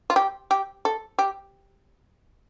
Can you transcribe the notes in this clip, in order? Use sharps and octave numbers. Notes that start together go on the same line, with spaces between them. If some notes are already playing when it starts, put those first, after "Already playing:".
F4
G4
G4
A4
G4